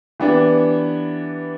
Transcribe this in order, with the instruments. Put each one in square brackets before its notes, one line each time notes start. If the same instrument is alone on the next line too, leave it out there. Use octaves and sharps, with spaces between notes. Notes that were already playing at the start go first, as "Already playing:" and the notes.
[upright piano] E3 B3 D4 G4